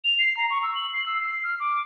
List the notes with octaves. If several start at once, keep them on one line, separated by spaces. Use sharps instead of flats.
F7
C7
A#5
C#6
E6
F#7
C7
E6
C7
F6
D6